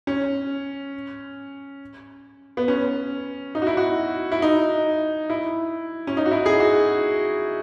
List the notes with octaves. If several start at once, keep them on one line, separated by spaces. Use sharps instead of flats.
C#4
B3
C#4
D#4
F#4
E4
F#4
E4
D#4
E4
C#4
D#4
F#4
E4
G#4
F#4